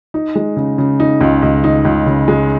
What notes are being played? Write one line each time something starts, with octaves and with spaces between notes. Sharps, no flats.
D#4
G#3
C#3
C#3
D#4
C#2
C#2
D#4
C#2
C#3
G#3